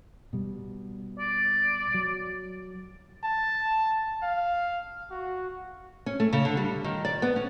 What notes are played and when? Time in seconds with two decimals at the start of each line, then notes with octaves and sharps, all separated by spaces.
0.33 B2 G3
1.19 D5
1.94 F#3
3.24 A5
4.23 F5
5.11 F#4
6.06 C#4
6.20 A3
6.33 C#3
6.45 D3
6.57 G3
6.84 D#3
7.05 D5
7.22 B3
7.36 C#4